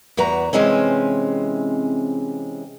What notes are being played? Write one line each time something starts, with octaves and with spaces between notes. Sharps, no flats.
E2 F#4 B4 A#5
C3 E3 G#3 C4 C#4